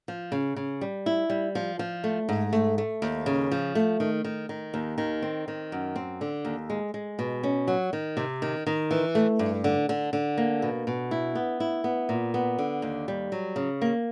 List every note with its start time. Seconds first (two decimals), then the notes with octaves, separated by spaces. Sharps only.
0.08 F3
0.32 C#3
0.56 C#3
0.81 G3
1.06 E4
1.30 G3
1.55 F3
1.79 F3
2.04 A3
2.29 G#2
2.53 A3
2.78 A3
3.02 D#2
3.26 C#3
3.51 F3
3.75 A3
4.00 D#3
4.24 D#3
4.49 D#3
4.74 D#2
4.98 D#3
5.22 C4
5.48 D#3
5.72 F#2
5.96 C4
6.21 D3
6.45 D#2
6.70 G#3
6.94 G#3
7.19 B2
7.43 C#4
7.68 F#3
7.93 D#3
8.17 C3
8.42 D#3
8.66 D#3
8.91 E3
9.15 A3
9.39 G2
9.64 D3
9.89 D3
10.13 D3
10.38 A#3
10.62 B2
10.87 B2
11.11 E4
11.35 B3
11.60 E4
11.84 B3
12.09 A#2
12.34 B3
12.59 D3
12.82 D#2
13.08 G3
13.32 F#3
13.56 C#3
13.82 A#3